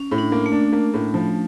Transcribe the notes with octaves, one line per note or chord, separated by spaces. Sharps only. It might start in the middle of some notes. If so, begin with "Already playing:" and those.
Already playing: C#4
A2
D4
A#3
A3
D4
A#3
A2
F3